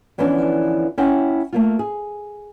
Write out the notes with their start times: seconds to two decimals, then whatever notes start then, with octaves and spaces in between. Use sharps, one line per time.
0.18 D3 E3 F3 B3 C#4 D4
0.98 C#4 E4 F#5 G5
1.53 A3 A#3 F4
1.79 G#4